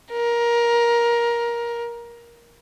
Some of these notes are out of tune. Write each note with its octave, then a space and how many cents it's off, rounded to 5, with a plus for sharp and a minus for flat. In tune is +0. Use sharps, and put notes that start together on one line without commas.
A#4 +20